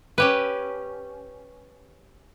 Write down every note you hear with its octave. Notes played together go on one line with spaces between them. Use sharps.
C#4 G4 B4